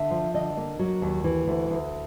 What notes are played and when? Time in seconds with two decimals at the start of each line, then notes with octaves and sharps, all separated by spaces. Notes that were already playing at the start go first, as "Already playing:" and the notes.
Already playing: D3 E5
0.11 F3
0.34 D3 D#5
0.57 A#3
0.79 F#3
1.02 D#2
1.24 E3
1.47 D2
1.71 D2